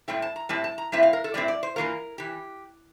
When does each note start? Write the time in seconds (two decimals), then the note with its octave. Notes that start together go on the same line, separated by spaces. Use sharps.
0.08 A2 G3 C4 E4 G5
0.22 A5
0.36 A#5
0.49 A2 G3 C4 E4 A5
0.64 A5
0.78 A#5
0.92 A2 G3 C4 E4 E5
1.03 F5
1.13 A#4
1.24 A4
1.34 A2 G3 C4 E4 D5
1.48 D5
1.63 C5
1.76 G2 E3 A#3 F4 A#4
2.18 E3 G4